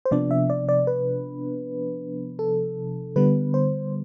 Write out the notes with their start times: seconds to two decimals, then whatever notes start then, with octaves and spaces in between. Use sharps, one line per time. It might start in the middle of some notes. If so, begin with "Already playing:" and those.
0.05 C5
0.11 C3 F3 B3 D4 D5
0.31 E5
0.50 D5
0.69 D5
0.87 B4
2.39 A4
3.16 D3 G3 B3 B4
3.54 C5